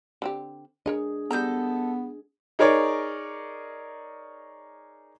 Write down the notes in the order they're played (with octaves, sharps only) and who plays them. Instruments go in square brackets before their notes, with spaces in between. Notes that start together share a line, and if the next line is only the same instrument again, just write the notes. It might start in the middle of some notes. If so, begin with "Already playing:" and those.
[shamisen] D3 C4 G4
[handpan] D4 G#4 [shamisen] A#4 C#5 D#5
[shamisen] G3 A#5 [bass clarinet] B3 [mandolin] A4 D#5 G6
[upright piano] D#4 G#4 A#4 C#5 D5